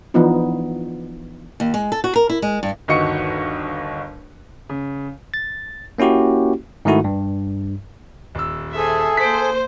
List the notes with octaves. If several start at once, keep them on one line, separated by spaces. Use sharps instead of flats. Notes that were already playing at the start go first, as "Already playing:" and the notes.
E3 F3 B3 D4 D#4 F4
D#2
G#3
A4
F#4
A#4
E4
G#3
G2
G1 D#2 F#4 D#5 C#6 C#7
C#3
A6
A#3 C#4 E4 F#4 G4
G#2 D#3 A3 E4 F#4
G2
D#1 E6
G#4 A4 C5 E5 G#5
A#3 C5 B6 D7